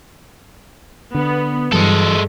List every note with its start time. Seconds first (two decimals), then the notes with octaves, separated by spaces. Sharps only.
1.15 D3 B3
1.73 G2 E3 F#3 G#3 A4